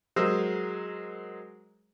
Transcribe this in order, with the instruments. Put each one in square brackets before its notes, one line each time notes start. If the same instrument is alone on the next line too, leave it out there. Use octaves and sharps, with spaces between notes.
[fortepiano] F#3 G#3 A#4 C5 D#5 E6